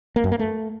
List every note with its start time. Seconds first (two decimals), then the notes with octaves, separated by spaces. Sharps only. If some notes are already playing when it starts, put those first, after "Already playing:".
0.16 A#3
0.24 F#2
0.32 A#3
0.39 A3